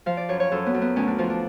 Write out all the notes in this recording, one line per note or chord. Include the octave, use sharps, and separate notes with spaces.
F3 F5
D5
F#2 C#5
C#5
F#2 A4
B3
F#2
B3
D2 C#4
D4
F3 F4
D4